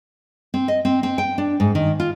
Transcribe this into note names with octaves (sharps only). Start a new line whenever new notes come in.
C4
D#5
C4
C4
G5
D4
G#2
D#3
F4